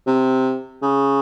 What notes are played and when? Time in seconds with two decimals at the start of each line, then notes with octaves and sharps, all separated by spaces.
0.07 C3
0.82 C#3